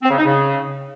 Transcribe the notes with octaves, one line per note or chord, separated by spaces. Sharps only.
C4
C#3
D#4
C#3